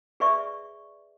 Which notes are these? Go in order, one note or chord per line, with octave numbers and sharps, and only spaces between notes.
G#4 B4 D5 E5 C#6